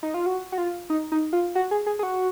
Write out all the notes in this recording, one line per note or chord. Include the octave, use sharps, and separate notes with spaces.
D#4
F4
F#4
F#4
F4
D#4
D#4
F4
F#4
G#4
G#4
G#4
F#4